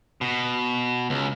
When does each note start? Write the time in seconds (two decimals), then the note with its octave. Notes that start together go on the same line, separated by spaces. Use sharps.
0.21 B2
1.10 C#2